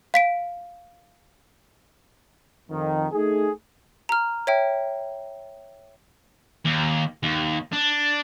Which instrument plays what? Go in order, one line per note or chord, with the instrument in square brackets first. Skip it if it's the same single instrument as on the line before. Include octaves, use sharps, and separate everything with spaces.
[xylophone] F5 B6 D7
[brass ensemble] F2 D#3
A3 D#4 G#4
[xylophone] A#5 F6
C#5 E5 G5
[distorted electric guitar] D#2
D#2
D4